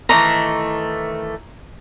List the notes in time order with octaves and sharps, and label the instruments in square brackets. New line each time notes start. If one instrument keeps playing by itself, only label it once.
[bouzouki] D#3 E3 A3 [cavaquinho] A#5